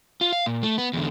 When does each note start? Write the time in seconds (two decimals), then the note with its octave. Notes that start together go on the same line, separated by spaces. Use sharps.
0.21 F4
0.33 F5
0.46 A#2
0.63 A3
0.78 B3
0.93 E2 D3